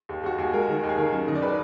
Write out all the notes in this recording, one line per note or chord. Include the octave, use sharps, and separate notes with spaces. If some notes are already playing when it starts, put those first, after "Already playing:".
D#2
D#2 F#4
D#2 G#4
G#3 A#4
D#3
D#2
G#4
D#3 A#4
F#2
D#3 D#5
D5
B4